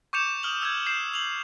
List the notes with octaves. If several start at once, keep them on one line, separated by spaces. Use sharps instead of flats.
C#6 D6 G6 C#7 E7 F7
D#6 F6 F#7
E6 G6 G#6
G6 C7 E7
F7 F#7